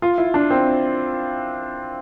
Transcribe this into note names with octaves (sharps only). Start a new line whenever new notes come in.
F4
E4
D4
C4